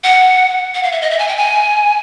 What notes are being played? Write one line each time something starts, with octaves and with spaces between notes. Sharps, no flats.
F#5
F#5
F5
E5
D#5
E5
G#5
G5
G#5